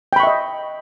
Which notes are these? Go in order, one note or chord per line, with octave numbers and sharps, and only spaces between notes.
D#5 E5 G5 B5 C#6